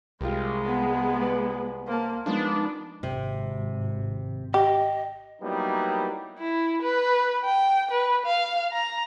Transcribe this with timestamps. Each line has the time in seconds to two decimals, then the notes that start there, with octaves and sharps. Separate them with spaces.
0.21 C2 G#3 F4 G4 A#4
0.67 B3
1.21 B4 D5 F#5
1.87 A#3 C5 A5
2.26 F3 G#3 B3 D4 D#4 A#4
3.03 G#1 C3
4.54 G4 D#5
5.42 F#3 G3 A#3 B3 D#4 E4
6.38 E4
6.82 B4
7.45 G5
7.91 B4
8.26 F5
8.72 A#5